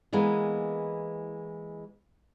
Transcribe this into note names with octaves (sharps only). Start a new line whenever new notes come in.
E3 G#3 A#3 B3